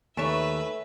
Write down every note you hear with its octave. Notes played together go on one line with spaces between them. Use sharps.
D#2 A3 B4 C#5 E5 G#5 B6 E7